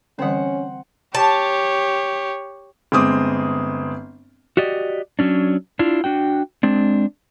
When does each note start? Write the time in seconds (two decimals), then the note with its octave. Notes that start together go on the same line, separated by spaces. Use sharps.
0.19 D3 E3 G3 C4 C#4 F#5
1.15 G4 C#5 A5
2.92 G1 G#3 C4 D6 D#6
4.57 F#4 G4 D5 D#5
5.19 F#3 C#4 D4
5.79 D4 E4 F4
6.04 D4 F#4 G5
6.63 G#3 C4 D4